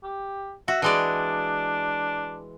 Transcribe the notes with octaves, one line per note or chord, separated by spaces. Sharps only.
G4
F#4 E5
E3 G#3 D4 D5